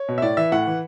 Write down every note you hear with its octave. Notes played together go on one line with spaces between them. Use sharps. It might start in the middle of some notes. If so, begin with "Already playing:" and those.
Already playing: C#5
B2
E5
A2 D5
E3 E5
A2 F#5
E3